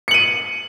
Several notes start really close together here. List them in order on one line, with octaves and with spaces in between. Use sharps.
C#7 F#7 D#7